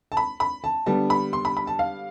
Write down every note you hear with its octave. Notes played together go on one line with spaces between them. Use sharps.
A5
B5
B5
A5
D3 G3 B3 A5
B5
C6
B5
B5
A5
F5